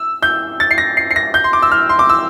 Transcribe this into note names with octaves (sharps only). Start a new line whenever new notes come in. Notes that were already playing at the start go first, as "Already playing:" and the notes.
Already playing: E6
G6
A6
C7
A#6
C7
C7
A#6
G6
C6
D6
E6
F6
C6
D6
E6